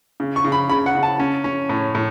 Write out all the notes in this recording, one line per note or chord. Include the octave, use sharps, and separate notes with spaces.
C#3
C#6
C#3
B5
C#3 B5
F#5
C#3
A5
C#4
C#4
A2
A2